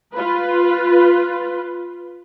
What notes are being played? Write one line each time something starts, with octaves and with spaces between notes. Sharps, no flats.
F4 B4